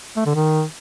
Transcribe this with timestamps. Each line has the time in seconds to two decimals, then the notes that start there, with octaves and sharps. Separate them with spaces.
0.17 A3
0.26 D3
0.35 D#3